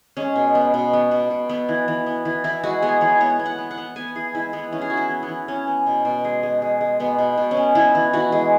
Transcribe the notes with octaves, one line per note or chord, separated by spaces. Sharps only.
G#3 C#4
B2
B3
B2
B3
B2
B2
B3
E3
E3
B3
E3
E3 E4
G#3 F#4
B3 G#4
E3 C#5
B3 C#5
B3
F#5
B3
F#5
B3
B3 G#5
E3 G#4
G#3 E4
E3 B3
E3 C#4
G#4
E3 F#4
E4
B3
B3
E3
B3 C#4
B3
B2
B2
G#3
G#3
G#3
G#3
B2 B3
B2
B2
C#4
B3
B3 E4
E3
E3 F#4
G#3